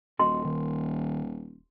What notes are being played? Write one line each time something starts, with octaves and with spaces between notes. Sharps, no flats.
D#1 F#4 A4 D#5 C6
D#3